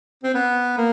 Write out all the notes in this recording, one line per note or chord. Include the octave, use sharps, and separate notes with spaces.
C4
B3
A#3